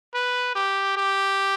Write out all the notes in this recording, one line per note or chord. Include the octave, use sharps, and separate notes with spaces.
B4
G4
G4